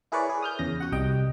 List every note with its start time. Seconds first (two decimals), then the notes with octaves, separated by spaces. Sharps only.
0.12 E4 G#4 A#4 B4 C#5 D5
0.29 G#4
0.42 D#6 F6 G6
0.59 E2 C#3 A#6
0.80 F#4 F#5
0.92 C2 G3 D#5 G5